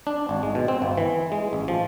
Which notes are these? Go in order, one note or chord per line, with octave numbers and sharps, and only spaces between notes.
D4
G#1
G#3
B2
C4
G1
E3
G#3
A1
F3